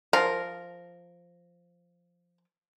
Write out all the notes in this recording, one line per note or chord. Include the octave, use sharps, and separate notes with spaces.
F3 A#4